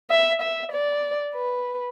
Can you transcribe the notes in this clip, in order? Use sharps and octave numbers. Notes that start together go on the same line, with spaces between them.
E5
E5
D5
B4